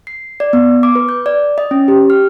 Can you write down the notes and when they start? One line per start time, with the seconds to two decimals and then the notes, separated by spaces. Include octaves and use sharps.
0.07 C7
0.40 D5
0.53 B3
0.83 D6
0.95 B4
1.09 G6
1.26 D5
1.58 D#5
1.71 C#4
1.88 G4
2.10 F6